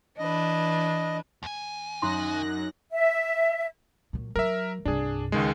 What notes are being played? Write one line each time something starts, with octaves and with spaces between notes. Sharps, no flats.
E3 D4 B4 D#5
D#2 G#5
F#2 D#4 A#5 C6 F#6 A#6
E5
A#2 F#3
F#3 A#4 E5
C2 G2 D4 G#4
C#2 D#3 G#3